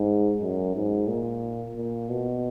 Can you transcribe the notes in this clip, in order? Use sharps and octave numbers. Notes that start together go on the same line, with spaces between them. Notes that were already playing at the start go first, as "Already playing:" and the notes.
Already playing: G#2
F#2
G#2
A#2
A#2
B2